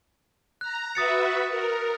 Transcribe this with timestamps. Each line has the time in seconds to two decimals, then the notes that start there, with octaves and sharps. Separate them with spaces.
0.61 A#5 F#6
0.95 F#4 B4 E5 D#6 A6 C#7
1.49 A#4